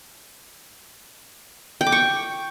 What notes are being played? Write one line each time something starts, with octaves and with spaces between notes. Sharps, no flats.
G5
D6
C#6